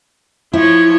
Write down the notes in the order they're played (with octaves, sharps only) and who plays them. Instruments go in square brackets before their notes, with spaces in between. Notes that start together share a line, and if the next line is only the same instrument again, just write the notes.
[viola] F3 C#5 [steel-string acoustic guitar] E4